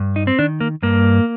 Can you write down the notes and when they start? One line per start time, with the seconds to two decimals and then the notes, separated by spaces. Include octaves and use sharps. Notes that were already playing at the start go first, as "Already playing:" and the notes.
Already playing: G2
0.16 D#4
0.27 C4
0.39 D#3 D4
0.60 A#3
0.83 G2 A#3